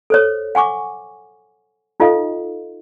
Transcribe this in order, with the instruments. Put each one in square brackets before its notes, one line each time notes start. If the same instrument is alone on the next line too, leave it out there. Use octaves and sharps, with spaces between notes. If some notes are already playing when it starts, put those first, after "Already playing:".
[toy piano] A4 C5 C#5
F#5 G#5 C#6 D6
D#4 F4 A4 D#5 F5